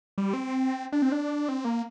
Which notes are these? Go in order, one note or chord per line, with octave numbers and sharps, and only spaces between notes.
G3
C4
D4
C4
D4
C4
A#3